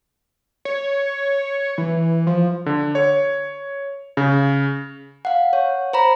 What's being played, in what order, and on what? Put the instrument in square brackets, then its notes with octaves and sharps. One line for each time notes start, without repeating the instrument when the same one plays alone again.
[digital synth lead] C#5
E3
F3
[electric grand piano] D3
C#5
C#3
[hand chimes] F5 F#5
C#5
C5 A#5 B5